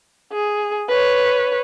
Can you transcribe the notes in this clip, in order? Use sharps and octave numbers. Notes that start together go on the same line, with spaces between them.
G#4
B4 C#5